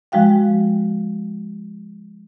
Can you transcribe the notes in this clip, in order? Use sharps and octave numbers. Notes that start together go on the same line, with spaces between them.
F3 G#3 F#4 F5 G5